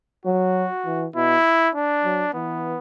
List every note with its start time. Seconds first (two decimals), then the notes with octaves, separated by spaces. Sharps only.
0.25 F#3 F#4
0.85 E3
1.15 B2 E4
1.75 D4
2.04 F#3
2.34 E3 B3